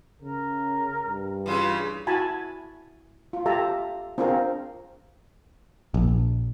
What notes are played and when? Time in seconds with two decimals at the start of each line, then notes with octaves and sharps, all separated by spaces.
0.22 C#3 A#4
1.06 G2
1.46 C#3 E3 F4
2.07 E4 F#4 G#5 A5 B5
3.33 F4
3.46 F4 G4 A4 E5 A5 A#5
4.18 C4 D4 F4 G#4 A#4
5.94 A#1